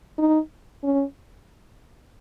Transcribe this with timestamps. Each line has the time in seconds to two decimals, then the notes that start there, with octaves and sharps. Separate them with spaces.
0.19 D#4
0.83 C#4